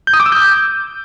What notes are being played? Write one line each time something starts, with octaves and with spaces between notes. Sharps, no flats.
G6
D#6
D6
E6
G6